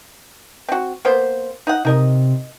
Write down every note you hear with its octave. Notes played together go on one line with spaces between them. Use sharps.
C4 F#4
A#3 B3 C5
D#4 D#5 F#5
C3 D#4 A#4 D#5